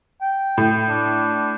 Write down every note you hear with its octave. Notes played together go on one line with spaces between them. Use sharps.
G5
A2
D4